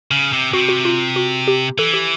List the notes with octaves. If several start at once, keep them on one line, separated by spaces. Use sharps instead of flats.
C#3
C3
C3 F#4
F#4
F4
F#4
G4
E3 A4
G4